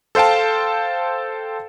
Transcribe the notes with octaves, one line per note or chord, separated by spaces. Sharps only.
A4 C5 F5 G5 A5